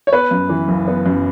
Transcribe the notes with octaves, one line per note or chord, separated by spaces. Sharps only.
C#5
B3 B4
F#2
E3
F#1
B3
F#2